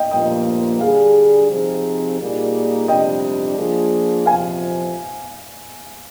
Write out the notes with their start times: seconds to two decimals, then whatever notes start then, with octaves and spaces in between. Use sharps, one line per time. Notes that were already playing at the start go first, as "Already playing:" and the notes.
Already playing: D#5 G5
0.11 G2 F3 A#3 F4 D#5 G5
0.81 D3 G3 D4 G#4 F5
1.50 C3 F3 C4 D#4 G#4
2.19 A#2 G3 A#3 D#4 G#4
2.88 F2 C3 G3 D4 D#5 G5
3.57 F3 A#3 D4 F4 G#4
4.26 F2 C3 F3 F5 G#5